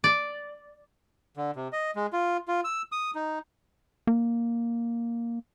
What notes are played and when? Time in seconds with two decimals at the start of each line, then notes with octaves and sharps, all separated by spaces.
0.04 D5
1.37 D3
1.56 C3
1.73 D#5
1.96 G#3
2.13 F4
2.48 F4
2.64 E6
2.92 D#6
3.15 D#4
4.07 A#3